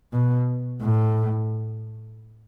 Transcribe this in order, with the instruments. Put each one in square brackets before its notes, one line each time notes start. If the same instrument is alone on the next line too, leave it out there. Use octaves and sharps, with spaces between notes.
[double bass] B2
A2